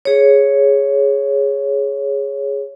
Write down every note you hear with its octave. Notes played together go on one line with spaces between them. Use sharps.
G#4 C#5